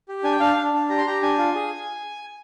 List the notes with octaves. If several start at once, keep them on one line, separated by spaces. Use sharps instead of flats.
G4
D4 G#5
G5
D4 F5
D4
D4
G4 A#5
C6
G4 A#5
D4 G#5
F4
G#4